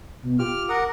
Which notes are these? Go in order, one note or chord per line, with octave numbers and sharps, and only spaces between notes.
B2
F4 G4 D6 F6
A#4 F#5 D#6